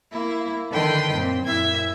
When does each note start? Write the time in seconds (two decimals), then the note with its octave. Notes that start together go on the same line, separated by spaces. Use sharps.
0.13 A#3 E4
0.72 D3 D#3 B4 G5 C6
1.12 F#2 A#2 C4
1.44 F#2 A#2 E4 E5 G#6